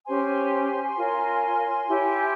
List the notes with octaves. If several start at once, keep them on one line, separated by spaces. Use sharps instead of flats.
C#4 G4 C5 G#5 C6
F4 A#4 C#5
E4 G4 C#5